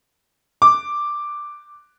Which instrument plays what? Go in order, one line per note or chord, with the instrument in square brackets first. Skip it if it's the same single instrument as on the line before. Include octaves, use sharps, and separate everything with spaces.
[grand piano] D6